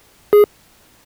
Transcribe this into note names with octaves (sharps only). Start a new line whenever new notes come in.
G#4